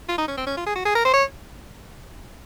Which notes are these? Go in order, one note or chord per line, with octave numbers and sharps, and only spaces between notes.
F4
D#4
C#4
C4
C#4
F4
G#4
F#4
G#4
A#4
C5
C#5